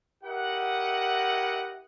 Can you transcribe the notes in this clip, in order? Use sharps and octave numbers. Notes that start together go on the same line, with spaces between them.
E4 G4 A#4 D#5 F#5